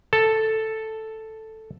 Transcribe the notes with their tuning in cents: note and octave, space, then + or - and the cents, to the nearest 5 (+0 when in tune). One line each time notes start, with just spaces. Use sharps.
A4 +0 A5 +0